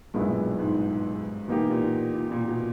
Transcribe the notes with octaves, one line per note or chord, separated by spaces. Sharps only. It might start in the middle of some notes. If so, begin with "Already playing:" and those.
B1 G2 A#2 G#3 B3 E4
G#2
B2 E3 A#3 D#4 G4
A#2
A#2
A#2
B2